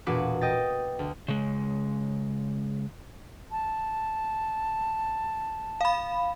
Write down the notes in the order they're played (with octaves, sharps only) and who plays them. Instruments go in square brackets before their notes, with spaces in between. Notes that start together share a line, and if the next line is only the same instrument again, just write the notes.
[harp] E1 A#2 F#4 B4 D6 F#6
D#5 G5 A6
D2
[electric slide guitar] C#3 G#3
[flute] A5
[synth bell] F5 B5